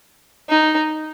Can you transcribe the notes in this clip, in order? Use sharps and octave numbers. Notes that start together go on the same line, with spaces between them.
D#4